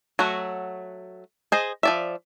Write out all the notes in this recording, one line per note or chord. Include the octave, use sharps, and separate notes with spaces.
F#3 A3 F#4
G#4 C5 D#5
F3 D5 E5